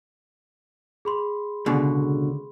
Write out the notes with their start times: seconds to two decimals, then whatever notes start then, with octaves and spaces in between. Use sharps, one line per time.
1.05 G#4 B5 C6
1.66 C#2 B2 D3